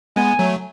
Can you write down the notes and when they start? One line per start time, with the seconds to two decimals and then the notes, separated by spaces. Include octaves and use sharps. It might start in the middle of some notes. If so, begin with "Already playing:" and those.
0.16 G#3 B3 G#5
0.39 F#3 A3